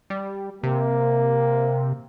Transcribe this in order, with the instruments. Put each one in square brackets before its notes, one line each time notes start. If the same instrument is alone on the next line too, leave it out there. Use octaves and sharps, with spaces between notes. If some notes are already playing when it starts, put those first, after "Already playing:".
[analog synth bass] G3
[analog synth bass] C3 [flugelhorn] A#3